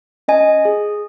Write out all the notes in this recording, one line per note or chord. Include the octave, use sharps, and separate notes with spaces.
C#4 D#5 G#5
G#4